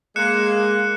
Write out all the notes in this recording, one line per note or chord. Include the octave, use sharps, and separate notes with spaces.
G#3 A#3 F#6 C#7 E7